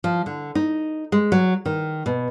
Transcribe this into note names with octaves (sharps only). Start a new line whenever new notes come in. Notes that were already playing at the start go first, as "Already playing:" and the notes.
F3
D3
D#4
G#3
F#3
D#3
B2